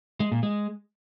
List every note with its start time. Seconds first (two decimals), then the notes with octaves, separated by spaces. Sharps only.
0.20 G#3
0.32 A#2
0.43 G#3